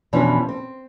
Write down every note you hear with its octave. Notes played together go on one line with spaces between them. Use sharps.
F2 B2 E3 F3 C#4 D4
C4